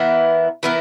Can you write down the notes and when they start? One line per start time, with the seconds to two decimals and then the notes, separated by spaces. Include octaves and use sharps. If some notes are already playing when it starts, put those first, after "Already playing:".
Already playing: E3 B3 E4 A#4
0.63 E3 B3 E4 A#4